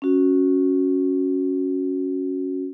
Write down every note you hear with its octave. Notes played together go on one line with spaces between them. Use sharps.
C#4 F#4